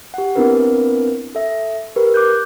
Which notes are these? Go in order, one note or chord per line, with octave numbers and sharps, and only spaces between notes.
G4 F#5
B3 C4 D4 E4 A#4 B4
A4 E5
G4 A#4 B4
D6 F#6 G6